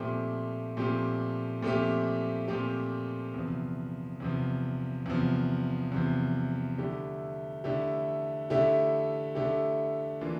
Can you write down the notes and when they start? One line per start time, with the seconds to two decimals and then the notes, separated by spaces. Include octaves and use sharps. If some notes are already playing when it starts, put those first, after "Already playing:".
Already playing: A#2 F3 A3 C4 G4
0.77 A#2 F3 A3 C4 G4
1.62 A#2 F3 A3 C4 G4
2.48 A#2 F3 A3 C4 G4
3.34 E2 C3 F3
4.20 E2 C3 F3
5.06 E2 C3 F3
5.92 E2 C3 F3
6.78 D3 A3 E4 G4
7.64 D3 A3 E4 G4
8.50 D3 A3 E4 G4
9.35 D3 A3 E4 G4
10.21 E3 A#3 D4 F4